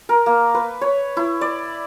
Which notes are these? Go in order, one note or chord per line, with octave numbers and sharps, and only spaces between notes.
A#4
A#3
B4
C#5
E4
D5